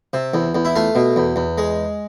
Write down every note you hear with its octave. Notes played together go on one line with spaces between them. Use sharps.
C3
E2
E2
E4
A3 F4
B2
E2
E2
G#3